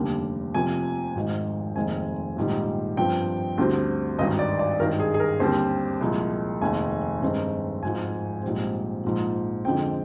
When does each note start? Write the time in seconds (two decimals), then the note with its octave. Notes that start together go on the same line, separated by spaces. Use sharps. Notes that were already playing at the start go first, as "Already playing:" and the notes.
Already playing: F1 D#2 D3 G3 A#3
0.54 F1 F2 C3 F3 A#3 G#5
1.15 G#1 G#2 D#3
1.75 F1 D#2 D#3 G#3 C4 G#5
2.36 A#1 G#2 D#3 G3
2.97 G2 F3 C4 G5
3.58 D2 D3 G3 C4
4.19 G#1 G2 D#3 D#5
4.39 D5
4.59 D5
4.79 G#1 G2 D#3 A#4
5.00 G#4
5.14 G#4
5.20 A#4
5.40 D#2 D3 G3 C4 C5
6.01 C2 A#2 F3 G#3
6.61 F1 D#2 D#3 G#3 G#5
7.22 G2 D#3 G#3 C4
7.83 G#1 G#2 F3 G#5
8.43 A#1 G#2 G3 C4
9.04 A#1 G#2 F3
9.65 F2 D3 G#3 C4 G5